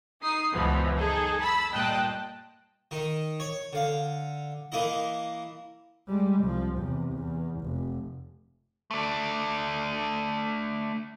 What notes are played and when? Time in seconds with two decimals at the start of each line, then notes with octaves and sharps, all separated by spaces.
0.22 D#4 D#6 C7
0.53 C#2 F#2 B2 E3 F3 B3
0.95 D#4 G#4 A4
1.39 A5 B5 E6
1.72 G2 A#2 D#5 G5 A5 F#6
2.91 D#3 D#4
3.40 C#5
3.73 D3 F5
4.72 E3 A#3 E4 D#5
6.08 G3 G#3
6.43 C2 F3
6.76 E2 C3
7.12 E2
7.61 F1
8.91 A3 D4